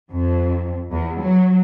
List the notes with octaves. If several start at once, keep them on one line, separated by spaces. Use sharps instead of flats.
F2
E2
F#3